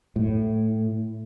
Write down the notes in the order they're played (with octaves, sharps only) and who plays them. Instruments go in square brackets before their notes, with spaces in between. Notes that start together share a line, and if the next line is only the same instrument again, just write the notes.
[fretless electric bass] A2